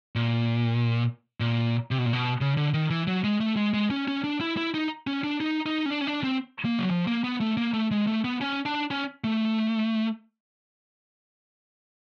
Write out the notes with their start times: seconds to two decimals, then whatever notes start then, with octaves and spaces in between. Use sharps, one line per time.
0.15 A#2
1.40 A#2
1.91 C3
1.98 B2
2.06 A#2
2.13 B2
2.41 C#3
2.57 D3
2.74 D#3
2.90 E3
3.07 F#3
3.24 G#3
3.40 A3
3.57 G#3
3.74 G#3
3.91 C#4
4.08 C#4
4.24 D4
4.41 E4
4.57 E4
4.74 D#4
5.07 C#4
5.24 D4
5.40 D#4
5.66 D#4
5.86 C#4
5.91 D4
6.01 C#4
6.07 D4
6.24 C4
6.65 A#3
6.79 F#3
6.91 F3
7.07 A#3
7.24 B3
7.40 A3
7.57 A#3
7.73 A3
7.91 G#3
8.07 A3
8.24 B3
8.41 C#4
8.65 D4
8.91 C#4
9.24 A3